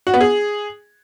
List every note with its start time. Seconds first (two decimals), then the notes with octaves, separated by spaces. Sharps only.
0.07 F#4
0.14 B3
0.21 G#4